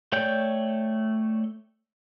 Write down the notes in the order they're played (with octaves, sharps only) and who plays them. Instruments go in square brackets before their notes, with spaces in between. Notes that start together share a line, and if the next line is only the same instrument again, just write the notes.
[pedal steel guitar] A3 C#5 D5 G5 G6